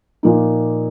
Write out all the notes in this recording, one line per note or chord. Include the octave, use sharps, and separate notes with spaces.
A#2 F3 A#3 D#4